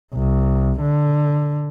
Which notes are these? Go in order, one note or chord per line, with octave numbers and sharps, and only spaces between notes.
C2
D3